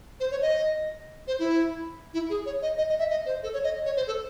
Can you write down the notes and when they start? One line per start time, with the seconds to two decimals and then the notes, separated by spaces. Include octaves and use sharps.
0.20 C5
0.31 C#5
0.42 D#5
1.27 C5
1.39 E4
2.14 E4
2.30 G#4
2.46 C#5
2.62 D#5
2.78 D#5
2.89 D#5
2.99 E5
3.11 D#5
3.26 C5
3.43 A4
3.53 C#5
3.64 D#5
3.86 C#5
3.96 C5
4.07 A4